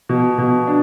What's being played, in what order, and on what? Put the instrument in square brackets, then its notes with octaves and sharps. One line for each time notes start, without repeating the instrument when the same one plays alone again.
[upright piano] B2
B2
D4